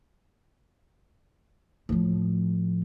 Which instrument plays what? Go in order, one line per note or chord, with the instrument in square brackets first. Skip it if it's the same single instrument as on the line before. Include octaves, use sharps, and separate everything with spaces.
[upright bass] A2 F3